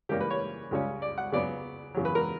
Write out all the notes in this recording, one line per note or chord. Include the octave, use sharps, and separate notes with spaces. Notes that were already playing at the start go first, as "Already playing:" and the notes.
C#3 E3 G3 A#3 C#4 G4
B4
C#5
C#2 C#3 G3 C#4
D5
F#5
C#3 F#3 B3 D5
E2 C#3 F#3
B4
A#4